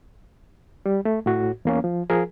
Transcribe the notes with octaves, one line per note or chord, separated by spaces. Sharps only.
G3
A3
A2 F#4
E2 A#3 C#4
F3
F3 G#4 A#4